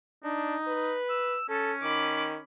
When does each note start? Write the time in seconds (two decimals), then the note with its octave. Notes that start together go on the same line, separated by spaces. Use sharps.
0.24 D4 D#4
0.67 B4
1.10 E6
1.49 C#4 A4
1.82 D#3 B5 D6